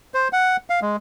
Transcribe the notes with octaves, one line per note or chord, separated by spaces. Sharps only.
C5
F#5
F5
G#3